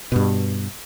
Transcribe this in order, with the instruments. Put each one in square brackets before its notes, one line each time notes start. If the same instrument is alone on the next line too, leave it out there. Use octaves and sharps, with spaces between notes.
[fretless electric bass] G2 B2